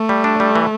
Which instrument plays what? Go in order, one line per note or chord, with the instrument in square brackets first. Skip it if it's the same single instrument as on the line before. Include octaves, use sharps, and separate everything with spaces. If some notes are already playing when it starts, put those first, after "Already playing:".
Already playing: [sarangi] A3
[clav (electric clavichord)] G3
D4
G3
E3